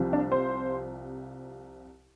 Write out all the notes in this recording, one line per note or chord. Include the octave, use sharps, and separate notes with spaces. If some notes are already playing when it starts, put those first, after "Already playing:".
Already playing: C2 C3 F3
D4
C5